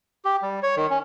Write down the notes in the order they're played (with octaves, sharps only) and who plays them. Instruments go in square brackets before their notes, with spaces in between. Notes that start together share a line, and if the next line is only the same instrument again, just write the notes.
[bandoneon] G4
G3
C#5
D#3
C#4